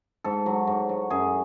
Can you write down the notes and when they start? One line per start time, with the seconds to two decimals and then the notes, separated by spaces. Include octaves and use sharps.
0.24 G#2 A4
0.46 F#3
0.67 G#2
0.89 F#3
1.10 F#2 G#4